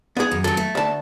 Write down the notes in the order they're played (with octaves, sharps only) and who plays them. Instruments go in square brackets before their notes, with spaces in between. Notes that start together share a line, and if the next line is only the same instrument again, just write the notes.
[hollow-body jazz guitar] B3 G#4
[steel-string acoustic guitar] F#2
[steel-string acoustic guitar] C#3 F#3 [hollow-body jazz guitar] A4
[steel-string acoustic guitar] A3
[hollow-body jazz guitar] D2 A5